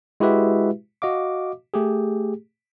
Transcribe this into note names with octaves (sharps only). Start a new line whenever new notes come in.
G#3 E4 F#4 G4 B4 E5
F#4 D#5 F5 D6
A3 G4 G#4